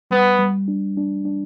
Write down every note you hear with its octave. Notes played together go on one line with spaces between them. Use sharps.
G3 B3
G3
D4
D4
D4